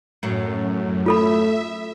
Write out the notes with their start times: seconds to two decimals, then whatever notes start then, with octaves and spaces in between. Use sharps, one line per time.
0.23 F#2 A2 F#3
1.06 A3 F4 A4 E5 B5